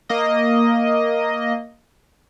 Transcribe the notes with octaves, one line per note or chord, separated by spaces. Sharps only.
A#3 D#5